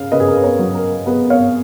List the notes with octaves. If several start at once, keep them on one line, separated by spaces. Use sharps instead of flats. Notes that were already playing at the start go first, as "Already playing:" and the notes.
Already playing: C#3 F5
C#3 B4 D#5
G#4
A#4
B4
A#4 C#5
F#3
A#4
B3 G#4 B4
C#5 F5